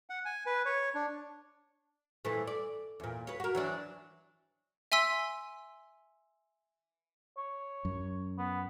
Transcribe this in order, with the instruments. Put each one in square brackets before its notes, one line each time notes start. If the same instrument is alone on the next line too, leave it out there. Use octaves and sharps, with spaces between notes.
[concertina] F#5
G#5
B4
C#5
D4
[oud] A#2 E3 A3
D5
E2 A#2
B4 C#5
F#4 A#4
E3 F#3 D4
[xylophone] E5 G#5 C6 E6 B6
[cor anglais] C#5
[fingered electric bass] F#2
[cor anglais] B3